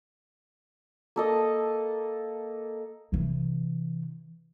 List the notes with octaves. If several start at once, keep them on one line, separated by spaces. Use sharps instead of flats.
A#3 A4 D#5
C3 E3